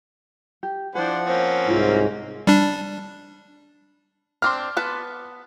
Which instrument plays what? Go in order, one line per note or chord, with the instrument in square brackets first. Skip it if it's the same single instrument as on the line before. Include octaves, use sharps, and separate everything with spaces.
[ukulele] G4
[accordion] F3 F#5 [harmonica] D4 C5 [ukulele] E4 G#4
[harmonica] A#3 C4 C#4
[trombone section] C2 G#2 [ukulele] E4 F4 A#4
[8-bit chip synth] G3 D4
[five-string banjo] C4 D4 [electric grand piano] C6 D6 F6
[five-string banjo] B3 B4 A5